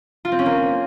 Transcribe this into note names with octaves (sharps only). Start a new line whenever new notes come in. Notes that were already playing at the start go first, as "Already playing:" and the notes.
F4
C4
C#4
A#3